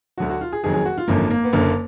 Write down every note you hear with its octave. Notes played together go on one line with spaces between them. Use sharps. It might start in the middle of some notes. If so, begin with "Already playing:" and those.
D2 D3 F#3 F#4
F#4
F4
G#4
F#1 F2 D#3 F#3 G#4
G#4
F#4
F4
G#1 F#2 D3 F3 A#3
A#3
B3
F#1 F#2 D3 A#3